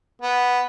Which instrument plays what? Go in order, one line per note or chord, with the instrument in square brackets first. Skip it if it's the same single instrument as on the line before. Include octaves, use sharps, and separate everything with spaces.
[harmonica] B3